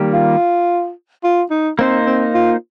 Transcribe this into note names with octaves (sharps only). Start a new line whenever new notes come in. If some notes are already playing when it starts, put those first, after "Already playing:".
Already playing: D#3 G3 A#3 G4
F4
F4
D#4
A#3 C4 D#4 C5
C4
F4